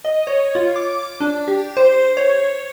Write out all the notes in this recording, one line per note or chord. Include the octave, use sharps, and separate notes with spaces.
D#5
C#5
F4
D6
D4
G4
C5
C#5